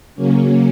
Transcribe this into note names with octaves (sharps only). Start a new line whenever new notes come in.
C#3 F#3 A#3 C#4